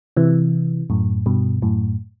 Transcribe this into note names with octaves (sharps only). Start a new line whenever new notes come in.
C3 E3
F#2 A2
G2 B2
F#2 A2